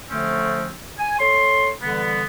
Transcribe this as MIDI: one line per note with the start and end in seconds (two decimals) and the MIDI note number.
0.10 0.73 50
0.10 0.73 53
0.10 0.73 57
0.10 0.73 60
0.10 0.73 61
0.99 1.19 80
1.19 1.70 69
1.19 1.70 73
1.19 1.70 84
1.82 2.25 50
1.82 2.25 52
1.82 2.25 55
1.82 2.25 59